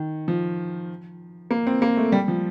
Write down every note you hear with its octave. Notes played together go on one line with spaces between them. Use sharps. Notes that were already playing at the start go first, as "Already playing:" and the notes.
Already playing: D#3
F3
A#3
C4
A#3
A3
G3
F3